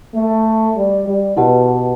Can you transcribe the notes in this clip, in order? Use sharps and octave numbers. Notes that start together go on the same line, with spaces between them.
A3
G3
G3
B2 E4 G4 B4 F#5 A5